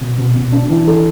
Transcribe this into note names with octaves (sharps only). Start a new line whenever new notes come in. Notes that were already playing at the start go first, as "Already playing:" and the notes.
B2
B2
B2
D4
E3
A4